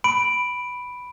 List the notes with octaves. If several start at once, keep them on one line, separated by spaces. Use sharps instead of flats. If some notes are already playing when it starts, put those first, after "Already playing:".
B5 D7